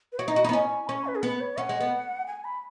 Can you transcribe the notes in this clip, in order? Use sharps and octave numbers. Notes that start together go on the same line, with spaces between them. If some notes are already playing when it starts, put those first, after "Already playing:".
B4
F#4 C#5
D#4 D#5
F#4
D#4 B5
B3
C#4 G#5
C#4 C#6
B4
G#4
B3 B4
B4
C#5
C#4 F#5
G#3
B3
G#5
B5